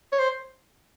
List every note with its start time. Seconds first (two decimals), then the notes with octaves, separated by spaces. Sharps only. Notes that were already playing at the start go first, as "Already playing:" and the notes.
0.12 C#5
0.19 C5